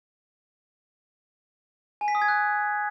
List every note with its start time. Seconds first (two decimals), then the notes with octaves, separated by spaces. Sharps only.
2.01 G#5
2.08 B6
2.15 D#6
2.22 G#6
2.28 F#6